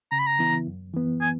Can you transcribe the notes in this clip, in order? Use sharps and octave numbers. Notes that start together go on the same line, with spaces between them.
C#3 A#5
B5
A#5
E3 B3 E4
F#2
E3 B3
G#5